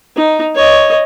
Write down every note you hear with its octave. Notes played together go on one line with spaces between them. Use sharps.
D#4
C#5 D#5